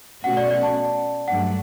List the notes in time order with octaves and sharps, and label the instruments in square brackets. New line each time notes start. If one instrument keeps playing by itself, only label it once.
[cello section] B2 A3 C#4 F#4 [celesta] F#5
[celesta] D5
D5
A5
[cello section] G2 F#3 A3 D4 [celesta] F#5